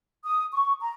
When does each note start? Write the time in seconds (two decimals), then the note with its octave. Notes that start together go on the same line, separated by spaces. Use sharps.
0.25 D#6
0.52 C#6
0.80 A#5